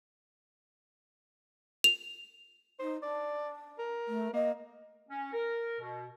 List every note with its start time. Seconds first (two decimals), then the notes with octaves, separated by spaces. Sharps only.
1.84 F7
2.79 D#4 C5
3.03 D4 D5
3.78 A#4
4.08 A3
4.34 A#3 D#5
5.09 C#4
5.33 A#4
5.81 B2